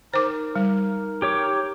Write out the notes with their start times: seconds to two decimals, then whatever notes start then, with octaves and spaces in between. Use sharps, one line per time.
0.14 D#4 A#4 C5 D6
0.56 G3
1.22 G4 C#5 D6